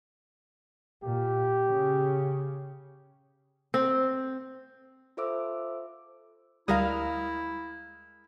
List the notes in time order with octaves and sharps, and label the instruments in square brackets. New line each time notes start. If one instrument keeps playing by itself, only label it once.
[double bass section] A#2 [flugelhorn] G4
[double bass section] C#3
[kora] C4
[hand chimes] F4 A4 C5 E5 D6 E6
[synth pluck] D2 G3 D#6 [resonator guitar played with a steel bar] G#3 A#4 F5 [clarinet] E4